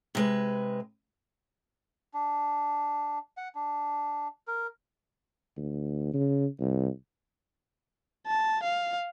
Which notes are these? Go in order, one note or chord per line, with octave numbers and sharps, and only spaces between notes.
C3 G#3 B4
D4
F#5
D4
A#4
D2
C#3
C2
A5
F5